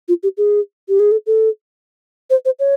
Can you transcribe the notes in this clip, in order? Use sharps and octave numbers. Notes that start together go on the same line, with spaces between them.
F4
G4
G#4
G4
G#4
A4
A4
C5
C5
C#5